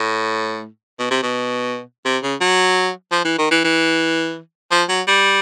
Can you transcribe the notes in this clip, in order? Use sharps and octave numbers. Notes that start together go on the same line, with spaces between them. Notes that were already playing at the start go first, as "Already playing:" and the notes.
Already playing: A2
B2
C3
B2
C3
C#3
F#3
F3
E3
D#3
E3
E3
F3
F#3
G3